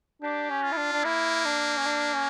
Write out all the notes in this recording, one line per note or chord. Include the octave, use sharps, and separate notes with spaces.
D4 G4
C#4
F4
E4
D4
D4
A#3 E4
D4
C#4
D4
C#4